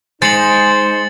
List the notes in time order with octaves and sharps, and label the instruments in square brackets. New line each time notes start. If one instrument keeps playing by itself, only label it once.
[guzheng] G#3 [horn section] D#4 C5 [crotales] A6 C#7 F#7